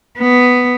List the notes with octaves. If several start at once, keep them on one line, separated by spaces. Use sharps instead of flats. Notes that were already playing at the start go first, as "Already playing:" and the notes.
B3